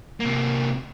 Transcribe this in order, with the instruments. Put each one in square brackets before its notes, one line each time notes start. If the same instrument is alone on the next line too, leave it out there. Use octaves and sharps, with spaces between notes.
[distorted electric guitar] C3 A#3